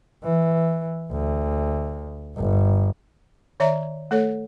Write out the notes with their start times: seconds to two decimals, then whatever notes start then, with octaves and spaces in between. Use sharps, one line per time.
0.23 E3
1.12 D2
2.37 G1
3.60 D#3 C#5 D5 E5 A#5
4.11 A3 A4 C#5